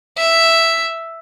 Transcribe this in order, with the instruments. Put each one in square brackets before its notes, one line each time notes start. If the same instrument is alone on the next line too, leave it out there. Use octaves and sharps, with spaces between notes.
[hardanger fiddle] E5